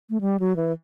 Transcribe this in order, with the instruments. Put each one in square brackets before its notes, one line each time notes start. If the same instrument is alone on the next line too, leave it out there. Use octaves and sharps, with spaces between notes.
[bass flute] A3
G3
F#3
E3